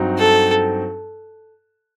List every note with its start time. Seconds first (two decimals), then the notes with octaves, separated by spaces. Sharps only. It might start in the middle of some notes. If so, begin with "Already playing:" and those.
Already playing: G2 F#3 C4 D#4 F#4
0.19 A4